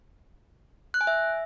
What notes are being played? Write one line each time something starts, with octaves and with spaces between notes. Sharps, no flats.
F#6
G#5
E5